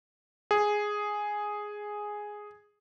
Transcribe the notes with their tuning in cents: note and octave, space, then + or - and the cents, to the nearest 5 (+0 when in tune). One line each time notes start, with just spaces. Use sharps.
G#4 +0